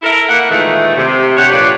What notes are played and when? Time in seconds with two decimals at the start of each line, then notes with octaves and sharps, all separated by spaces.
0.03 E4 A4 A#4
0.29 A#3 F#5
0.49 A#2 D#3 E3 G#3 A3
0.97 C3
1.36 D4 G4 C5 C#5 F#5
1.50 F2 A#2 D4 B4 C#5 D5